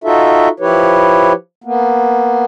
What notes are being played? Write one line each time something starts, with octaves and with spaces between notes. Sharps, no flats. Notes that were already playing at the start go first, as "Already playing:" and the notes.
D#4 F4 F#4 A4 E5
F3 E4 G4 B4 C#5
A#3 B3